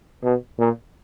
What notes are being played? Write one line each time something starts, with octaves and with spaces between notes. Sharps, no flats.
B2
A#2